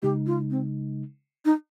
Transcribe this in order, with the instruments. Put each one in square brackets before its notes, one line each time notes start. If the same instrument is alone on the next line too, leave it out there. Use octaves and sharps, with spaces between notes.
[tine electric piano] C#3 G#3 D#4 [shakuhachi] G4
[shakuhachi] F4
C4
D#4